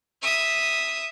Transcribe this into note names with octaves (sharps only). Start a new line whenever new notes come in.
E5 D#6